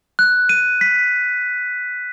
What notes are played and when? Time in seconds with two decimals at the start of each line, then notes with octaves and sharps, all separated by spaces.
0.19 F#6
0.49 D#7
0.81 B6